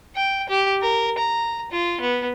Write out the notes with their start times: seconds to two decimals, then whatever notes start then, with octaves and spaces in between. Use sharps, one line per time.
0.16 G5
0.49 G4
0.82 A#4
1.18 A#5
1.71 F4
2.00 B3